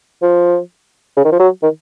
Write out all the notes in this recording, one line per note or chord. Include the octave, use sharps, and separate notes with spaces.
F3
C#3
D#3
F3
F#3
D#3